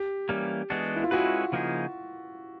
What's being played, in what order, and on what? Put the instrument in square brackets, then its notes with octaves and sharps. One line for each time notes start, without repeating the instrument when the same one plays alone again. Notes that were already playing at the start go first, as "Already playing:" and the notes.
Already playing: [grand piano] G4
[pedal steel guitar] E3 G3 A#3 C#4
E3 G#3 B3 D4 F#4
[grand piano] E4
F4
[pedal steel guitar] G#3 C#4 E4 G#4 B4 [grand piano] F#4
[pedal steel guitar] C#3 F3 A#3 D#4 G#4